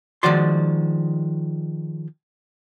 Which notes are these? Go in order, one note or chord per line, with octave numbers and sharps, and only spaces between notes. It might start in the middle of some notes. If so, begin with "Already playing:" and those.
D#3 F3 G#3 F#4 D5 C6